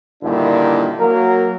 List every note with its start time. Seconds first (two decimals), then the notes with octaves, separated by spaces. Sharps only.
0.23 G2 A#2 D3 D#3 D4 E4
0.99 F#3 A#3 A#4